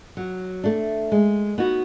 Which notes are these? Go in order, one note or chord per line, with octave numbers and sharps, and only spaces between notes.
F#3
A3 D4
G#3
B3 D#4 F#4 B4